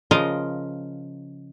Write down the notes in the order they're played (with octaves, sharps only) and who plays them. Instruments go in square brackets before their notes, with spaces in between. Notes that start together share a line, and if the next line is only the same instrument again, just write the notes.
[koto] C#3 F3 F4 A#4 D#5 F5